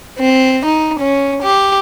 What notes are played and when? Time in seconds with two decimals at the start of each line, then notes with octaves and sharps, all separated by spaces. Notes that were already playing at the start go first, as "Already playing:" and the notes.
0.19 C4
0.65 D#4
1.00 C#4
1.43 G4